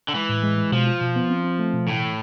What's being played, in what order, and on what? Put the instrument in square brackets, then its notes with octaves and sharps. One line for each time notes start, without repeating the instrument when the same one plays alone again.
[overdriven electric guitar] D3
[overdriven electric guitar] E3 [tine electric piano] G#3
[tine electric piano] A2
G#3
G#3
[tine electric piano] B2 [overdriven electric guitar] F3
[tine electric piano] F4
B2
B3
C4
C4
A3
B2
[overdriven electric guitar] A2 [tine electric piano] E3
[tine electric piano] A3